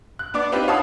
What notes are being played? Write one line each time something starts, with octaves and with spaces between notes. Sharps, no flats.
F#6
B3 D4 D5 D6
C4 D4 D#4 F4 G4 B4
C#5 F5 F#5 A5 B5 D#6